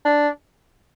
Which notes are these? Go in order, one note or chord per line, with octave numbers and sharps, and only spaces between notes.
D4